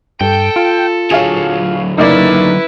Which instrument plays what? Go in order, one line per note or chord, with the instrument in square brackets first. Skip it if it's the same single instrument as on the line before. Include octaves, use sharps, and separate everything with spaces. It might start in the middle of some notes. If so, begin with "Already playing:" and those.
[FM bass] G2 [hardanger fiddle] A4 [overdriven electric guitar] G5
[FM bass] F4
[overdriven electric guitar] D3 F#3 [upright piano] G#4 C#5 F5
[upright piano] F#1 A#3 D5 [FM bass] D#4 [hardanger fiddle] E4 B4